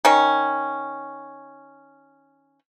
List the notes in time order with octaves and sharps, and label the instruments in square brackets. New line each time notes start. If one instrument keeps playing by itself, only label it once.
[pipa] D#3 C#4